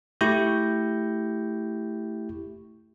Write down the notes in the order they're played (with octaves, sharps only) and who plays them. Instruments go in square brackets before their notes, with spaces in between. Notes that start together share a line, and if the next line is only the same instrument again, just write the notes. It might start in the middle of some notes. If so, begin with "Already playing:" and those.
[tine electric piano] A3 E4 G4 C#6 G6 A#6